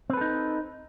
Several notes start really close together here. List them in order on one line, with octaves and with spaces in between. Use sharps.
C4 B4 A4 D#4